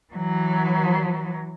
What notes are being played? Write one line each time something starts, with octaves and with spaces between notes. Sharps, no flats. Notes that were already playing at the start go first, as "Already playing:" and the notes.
E3 F#3